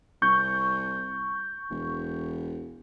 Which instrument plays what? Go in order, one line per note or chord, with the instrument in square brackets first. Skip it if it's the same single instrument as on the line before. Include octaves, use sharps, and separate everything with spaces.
[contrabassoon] C2 [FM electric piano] C#6 G6
[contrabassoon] E1